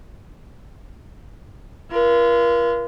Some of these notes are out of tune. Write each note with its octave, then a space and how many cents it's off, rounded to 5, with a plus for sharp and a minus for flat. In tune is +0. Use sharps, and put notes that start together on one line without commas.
F4 -35 A#4 +45